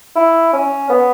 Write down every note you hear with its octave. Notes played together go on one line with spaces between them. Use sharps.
E4
C#4
B3